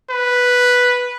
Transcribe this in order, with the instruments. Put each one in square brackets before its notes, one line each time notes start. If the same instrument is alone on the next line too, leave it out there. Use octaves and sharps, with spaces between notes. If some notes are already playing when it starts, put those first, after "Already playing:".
[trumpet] B4